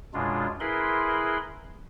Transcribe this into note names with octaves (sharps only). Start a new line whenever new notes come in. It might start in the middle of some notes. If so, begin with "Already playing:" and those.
F#2 B2 G#3 D4 F4
E4 G#4 A#4 B4 B5 C6